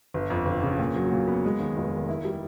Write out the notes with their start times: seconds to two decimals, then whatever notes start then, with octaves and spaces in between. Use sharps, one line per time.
0.14 G1
0.30 F2
0.46 G1
0.63 C#3
0.79 A#2
0.96 F#3
1.12 A#2
1.28 B3
1.44 G#3
1.60 D#2
1.76 F1
1.93 D#3
2.09 E4
2.25 G3